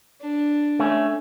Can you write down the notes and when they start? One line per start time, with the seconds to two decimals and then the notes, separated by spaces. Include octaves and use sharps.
0.21 D4
0.79 A3 C#4